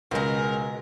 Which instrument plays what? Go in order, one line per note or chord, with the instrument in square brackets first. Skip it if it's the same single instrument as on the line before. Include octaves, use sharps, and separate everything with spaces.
[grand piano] C#2 [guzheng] B2 G#3 [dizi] A#4